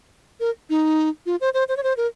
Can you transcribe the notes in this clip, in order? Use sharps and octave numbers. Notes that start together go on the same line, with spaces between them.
A#4
D#4
F4
C5
C5
C5
C#5
C5
A#4